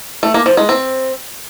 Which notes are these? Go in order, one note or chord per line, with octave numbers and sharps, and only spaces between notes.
A3
A#3
F3
G#3
C4